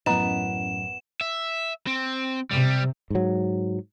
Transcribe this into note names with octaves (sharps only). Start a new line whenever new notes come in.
A1 F#2 B3 B4 D#5 A#5 E7
E5
C4
C3 G3
G#2 F#3